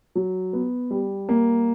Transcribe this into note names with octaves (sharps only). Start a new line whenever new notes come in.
F#3
B3
G3
A#3